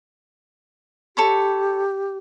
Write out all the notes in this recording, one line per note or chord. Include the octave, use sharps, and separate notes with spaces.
G4 A4 C#5 B5